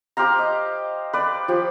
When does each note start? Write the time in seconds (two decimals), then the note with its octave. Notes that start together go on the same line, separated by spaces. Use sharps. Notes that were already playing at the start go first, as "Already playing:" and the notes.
0.17 G4 C5 F5 A#5
0.39 D#5
1.13 B4 D5
1.48 F3 G4